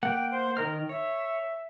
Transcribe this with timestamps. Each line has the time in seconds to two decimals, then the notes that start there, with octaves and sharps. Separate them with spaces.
0.03 A#3 F#5 G5
0.31 C5
0.57 D#3 A#4 D#5 F6
0.89 C#5 E5